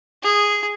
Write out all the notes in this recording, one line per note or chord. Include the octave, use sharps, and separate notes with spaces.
G#4